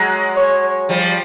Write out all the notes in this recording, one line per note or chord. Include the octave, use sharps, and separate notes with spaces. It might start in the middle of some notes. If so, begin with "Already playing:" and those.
Already playing: F#3 G#3
C#5
F3 G3